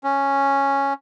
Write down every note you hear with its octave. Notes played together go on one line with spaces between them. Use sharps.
C#4